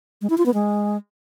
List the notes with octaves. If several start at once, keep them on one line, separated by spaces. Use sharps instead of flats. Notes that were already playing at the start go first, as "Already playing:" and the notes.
G#3
E4
F4
B3
G#3